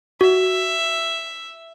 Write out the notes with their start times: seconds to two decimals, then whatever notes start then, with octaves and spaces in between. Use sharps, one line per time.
0.21 F#4 E5